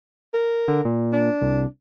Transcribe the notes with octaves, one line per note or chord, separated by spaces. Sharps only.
A#4
D3
A#2
D4
C2